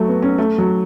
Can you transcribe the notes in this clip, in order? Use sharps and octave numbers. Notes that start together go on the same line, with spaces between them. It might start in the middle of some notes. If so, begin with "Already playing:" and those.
Already playing: F#3 A3
B3
C#4
A3
F#3